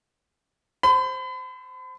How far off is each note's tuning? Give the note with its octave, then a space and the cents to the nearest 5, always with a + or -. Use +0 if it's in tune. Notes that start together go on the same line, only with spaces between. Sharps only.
C5 +0 B5 +40